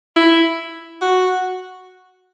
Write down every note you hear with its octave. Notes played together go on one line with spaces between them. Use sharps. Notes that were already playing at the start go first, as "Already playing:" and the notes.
E4
F#4